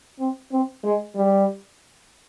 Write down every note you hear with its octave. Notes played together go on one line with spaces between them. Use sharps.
C4
C4
G#3
G3